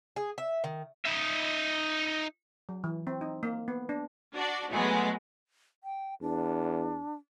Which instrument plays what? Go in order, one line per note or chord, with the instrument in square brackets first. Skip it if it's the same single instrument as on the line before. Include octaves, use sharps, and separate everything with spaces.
[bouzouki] G#4
E5
D#3
[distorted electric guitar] D#4 E5
[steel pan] F#3
E3
C4
D#4
A#3
B3
D4
[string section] D4 F#4 D5
F#3 G#3 A3 B3
[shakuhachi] G5
[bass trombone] E2 [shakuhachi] D4